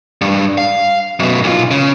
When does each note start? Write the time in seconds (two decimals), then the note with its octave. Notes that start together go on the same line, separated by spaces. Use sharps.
0.21 G2
0.58 F5
1.20 F#2 B2
1.44 B1 F4
1.71 C#3